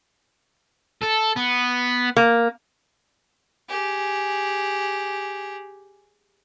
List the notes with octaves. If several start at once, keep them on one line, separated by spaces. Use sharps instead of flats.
A4
B3
A#3
G4 G#4